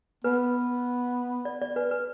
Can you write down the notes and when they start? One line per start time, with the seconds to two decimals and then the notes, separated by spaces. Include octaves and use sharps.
0.24 B3 B4
1.45 D5
1.62 D5
1.76 B4
1.91 B4